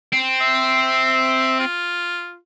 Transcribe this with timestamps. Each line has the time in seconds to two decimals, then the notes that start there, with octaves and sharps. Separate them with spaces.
0.13 C4
0.41 E5
1.60 F4